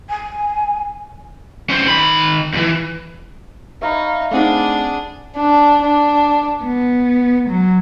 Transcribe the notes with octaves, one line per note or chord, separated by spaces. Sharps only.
G#5
C#4 C5
D#3 B5
E2 E3
D#4 C#5 E5 F5 A#5 B5
A3 C4 D4 D#4 G#4 D5 F#5
D4
D4
B3
F#3